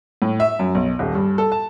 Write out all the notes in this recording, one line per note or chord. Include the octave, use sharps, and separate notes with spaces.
A2
E5
F#2
B1
D#1
G2
A4
A5